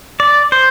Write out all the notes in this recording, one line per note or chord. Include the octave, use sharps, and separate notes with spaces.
D5
C5